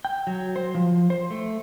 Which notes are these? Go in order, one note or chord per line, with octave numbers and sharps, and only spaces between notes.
G5
F#3
C5
F3
C5
A3